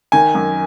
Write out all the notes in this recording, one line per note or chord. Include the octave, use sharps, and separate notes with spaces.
D#3 G#5
F#2